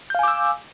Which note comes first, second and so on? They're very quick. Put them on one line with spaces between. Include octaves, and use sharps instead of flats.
G6 F5 G#5 D6 E6